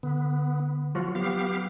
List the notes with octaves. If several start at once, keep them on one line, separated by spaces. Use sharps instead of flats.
D3 B3
F3 F#3 F4 F#4
B3 G4 F5